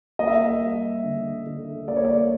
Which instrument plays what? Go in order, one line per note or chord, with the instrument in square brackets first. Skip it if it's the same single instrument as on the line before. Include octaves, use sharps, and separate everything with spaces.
[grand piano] A#3 D#5
E5
D#5
G3
D3
D3
A#3 D5
C#5
D5